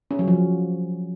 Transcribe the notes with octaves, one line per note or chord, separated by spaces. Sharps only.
C#4
F#3
F3